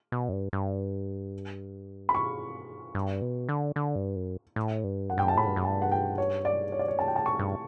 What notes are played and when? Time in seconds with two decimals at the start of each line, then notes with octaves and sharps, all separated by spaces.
0.12 B2
0.29 F#2
0.33 G2
0.53 G2
2.09 B5
2.15 C#6
2.95 G2
3.22 B2
3.49 D3
3.76 D3
3.96 G2
4.16 F#2
4.56 A2
4.84 G2
5.10 F#2 F#5
5.18 G2 G5
5.24 F#2 A5
5.37 A2 B5
5.47 G2
5.56 F#2
5.65 G2 A5
5.82 F#5
5.92 G5
6.18 C#5
6.45 D5
6.72 C#5
6.79 D5
6.88 C#5
6.99 F#2 A5
7.08 G5
7.16 A5
7.18 G2
7.26 C#6
7.39 G2